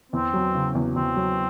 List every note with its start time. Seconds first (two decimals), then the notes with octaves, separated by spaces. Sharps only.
0.12 E2 C4
0.34 F#3
0.55 C#3
0.75 E2
0.96 E2 C4
1.16 F#3